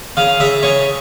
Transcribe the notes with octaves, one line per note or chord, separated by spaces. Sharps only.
C#3 F5
C#3 E5
C#3 C#5